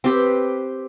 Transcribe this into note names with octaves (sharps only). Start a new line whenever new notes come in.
C4 G4 B4